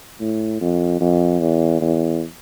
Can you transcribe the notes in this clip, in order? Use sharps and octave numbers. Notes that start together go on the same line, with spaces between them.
A2
F2
F2
E2
E2